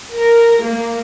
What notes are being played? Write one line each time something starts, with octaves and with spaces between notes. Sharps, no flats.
A#4
A#3